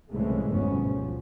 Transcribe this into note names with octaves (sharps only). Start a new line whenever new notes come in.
C2 A2 C#3 E3 G#3 A3
G1 F2 G#2 B2 B3 C#4
D2 F3